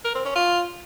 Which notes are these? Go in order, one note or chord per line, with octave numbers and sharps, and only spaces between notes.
A#4
C4
C#4
F4